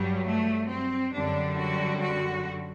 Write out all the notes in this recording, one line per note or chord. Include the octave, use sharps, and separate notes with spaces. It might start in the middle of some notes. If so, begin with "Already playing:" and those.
Already playing: G2 F#3 G3
A3
C4
F#2 D3 G3 D4
F#4
F#4